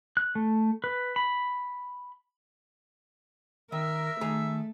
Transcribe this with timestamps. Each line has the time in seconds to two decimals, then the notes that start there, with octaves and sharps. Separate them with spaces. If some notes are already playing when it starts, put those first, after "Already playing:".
0.17 F#6
0.35 A3
0.84 B4
1.16 B5
3.72 D#3 A#4 E5
4.21 D#3 A3 G#4 A#5